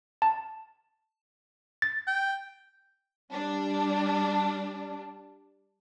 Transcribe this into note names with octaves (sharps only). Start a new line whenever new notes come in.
A5
A6
G5
G3 D4